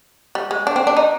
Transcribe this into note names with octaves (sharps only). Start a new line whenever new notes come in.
G3
G#3
D4
C4
D4
D#4